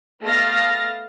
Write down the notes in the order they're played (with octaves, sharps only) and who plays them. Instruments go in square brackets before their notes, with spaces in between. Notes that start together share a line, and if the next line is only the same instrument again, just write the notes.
[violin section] A3 B3 D#5 F5 A6 A#6